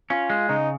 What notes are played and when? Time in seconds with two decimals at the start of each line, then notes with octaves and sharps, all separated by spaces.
0.10 C#4 F4
0.30 G#3
0.49 C#3 D#4